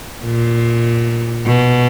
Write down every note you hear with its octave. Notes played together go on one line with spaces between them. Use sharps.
A#2
B2